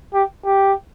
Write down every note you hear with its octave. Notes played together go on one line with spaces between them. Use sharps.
G4
G4